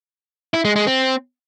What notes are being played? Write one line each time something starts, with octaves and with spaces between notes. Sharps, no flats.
E4
G#3
G#3
C4